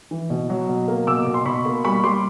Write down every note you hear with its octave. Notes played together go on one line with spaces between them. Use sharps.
E3
B2
F#3
B2
A#3
B2 D6 E6
B2
C6
B2 B5 C#6
A#3
G3 B5 C#6
G3 C6 D6